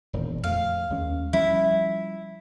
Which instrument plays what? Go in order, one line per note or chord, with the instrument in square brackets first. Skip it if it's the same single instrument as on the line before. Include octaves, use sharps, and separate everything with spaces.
[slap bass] E1 A#2 D#3
[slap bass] F2 A3 [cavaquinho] F5
[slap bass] D#2 G#3 C#4
[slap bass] F3 G3 C#4 [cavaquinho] E4